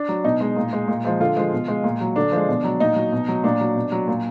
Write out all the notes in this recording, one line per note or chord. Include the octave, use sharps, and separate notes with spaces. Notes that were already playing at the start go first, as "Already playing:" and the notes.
Already playing: D4
F#3
B2 D#4
G#3
A#2
G#3
A#2
F3 G#3
D3 F4
F3 G#3
B2
G#3
A#2
F#3
D3 D4
F3 G#3
B2
F#3
A#2 D#4
F#3
B2
F#3
A#2 D4
F#3
B2
F#3
A#2